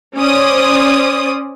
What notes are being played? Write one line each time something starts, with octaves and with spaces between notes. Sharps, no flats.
C#4 C5 D5 D#6